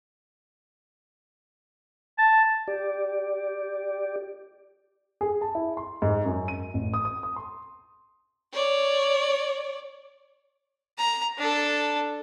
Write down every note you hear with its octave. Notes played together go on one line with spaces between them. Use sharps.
A5
G4 D5
G#4
A5
E4
C6
G#2
F#2
D#7
A1
D#6
D#6
D#6
C6
C#5 D5
A#5
D4 A4